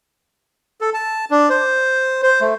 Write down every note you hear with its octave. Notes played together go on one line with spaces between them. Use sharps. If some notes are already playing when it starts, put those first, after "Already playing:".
A4
A5
D4
C5
C5
A3